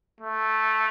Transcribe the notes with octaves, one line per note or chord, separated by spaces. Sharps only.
A3